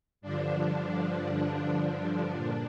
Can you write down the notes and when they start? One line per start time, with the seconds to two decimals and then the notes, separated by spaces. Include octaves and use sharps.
0.21 G2 D3 F3 D4
1.81 D4
2.34 A#2